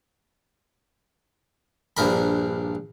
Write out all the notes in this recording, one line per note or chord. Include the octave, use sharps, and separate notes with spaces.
A#1 G2 A#4 B5